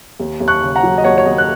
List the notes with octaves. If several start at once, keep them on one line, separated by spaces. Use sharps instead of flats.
D#2
D#2
C#6 F#6
C#3
F#5 A#5
F#3
D#5
D#2 C#5 F#5
C#5
D#2 D#5
F#6